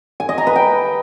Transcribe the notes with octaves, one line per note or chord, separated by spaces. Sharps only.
G#5
D#5
A#5
B4
G5